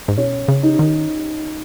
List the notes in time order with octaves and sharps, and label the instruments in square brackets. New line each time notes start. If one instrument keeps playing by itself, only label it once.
[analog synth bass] G#2
[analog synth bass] B2 [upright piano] C#4
[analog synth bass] C#3
[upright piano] D#4
[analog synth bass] D#3